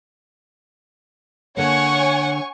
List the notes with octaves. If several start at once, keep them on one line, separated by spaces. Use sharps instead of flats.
D3 A#3 C#5 F#5 G#5 C#6